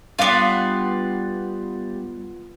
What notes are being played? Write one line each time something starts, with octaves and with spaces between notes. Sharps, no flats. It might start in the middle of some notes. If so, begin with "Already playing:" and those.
G3 B3 D4 F4 D5